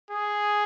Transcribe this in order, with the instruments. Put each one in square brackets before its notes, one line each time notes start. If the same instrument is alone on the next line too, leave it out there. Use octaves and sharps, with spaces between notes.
[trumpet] G#4